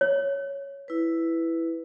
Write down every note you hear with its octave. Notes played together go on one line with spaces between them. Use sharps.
C#5
E4 B4